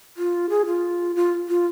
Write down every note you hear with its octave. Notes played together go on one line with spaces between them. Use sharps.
F4
G#4
F4
F4
F4